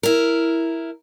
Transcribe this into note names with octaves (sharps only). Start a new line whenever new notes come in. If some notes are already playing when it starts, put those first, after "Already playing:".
E4 A#4